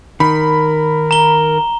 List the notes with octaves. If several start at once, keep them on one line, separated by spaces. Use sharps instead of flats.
D#3 A#4 B5
A#5 G7